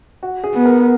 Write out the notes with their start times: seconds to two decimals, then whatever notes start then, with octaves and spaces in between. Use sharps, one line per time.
0.23 F#4
0.44 G#4
0.54 B3
0.65 A#4